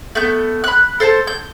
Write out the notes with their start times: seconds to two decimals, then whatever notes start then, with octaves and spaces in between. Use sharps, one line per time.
0.15 A3 B3 G6
0.64 B5 F#6
1.00 A4 C5 G#5 A5
1.27 G6